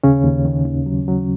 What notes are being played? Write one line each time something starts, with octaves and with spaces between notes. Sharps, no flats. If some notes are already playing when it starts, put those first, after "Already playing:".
D#2 C#3 C#4
D#2
D#3
D#2
F#3
F#3